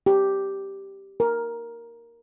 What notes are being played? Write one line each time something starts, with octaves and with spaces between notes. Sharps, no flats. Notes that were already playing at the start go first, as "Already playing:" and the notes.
G4
A#4